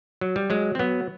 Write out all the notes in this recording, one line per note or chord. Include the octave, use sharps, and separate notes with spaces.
F#3
G3
F#3 G#3
C4
F#3 B3